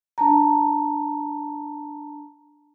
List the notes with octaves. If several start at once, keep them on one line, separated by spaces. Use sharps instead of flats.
D4 A5 A#5